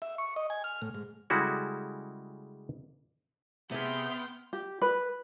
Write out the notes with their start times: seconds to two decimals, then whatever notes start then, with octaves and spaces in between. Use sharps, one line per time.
0.02 E5
0.18 C#6
0.36 D#5
0.50 G#5
0.64 F6
0.82 A2
0.94 G#2
1.30 C#3 G3 G#3 E4 F#4 A4
3.71 C3 B3 G#4 E5 G5 C6 F6
4.53 G4
4.82 B4